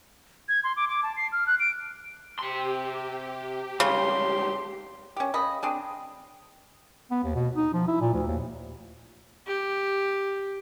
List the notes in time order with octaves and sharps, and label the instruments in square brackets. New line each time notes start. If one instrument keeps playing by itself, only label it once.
[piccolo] G#6
C6
D6
D6
A5
C7
F6
F#6
D7
[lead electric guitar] C3 C6 [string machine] G4
[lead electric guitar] C#2 G2 [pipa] C#3 [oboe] C6
[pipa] C#4 G4
C#3 D#5 B5
C4 D4 G#4
[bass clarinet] B3
D#2
B2
D#4
F3
E4
A#2
D2
D#2
[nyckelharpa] G4